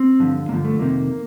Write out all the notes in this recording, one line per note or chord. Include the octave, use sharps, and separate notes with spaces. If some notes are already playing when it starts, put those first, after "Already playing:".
Already playing: C4
G2 D3 F3
G2 D3 F3 A#3
A3
F2 C3 D#3 A#3